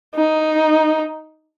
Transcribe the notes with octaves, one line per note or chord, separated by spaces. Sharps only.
D#4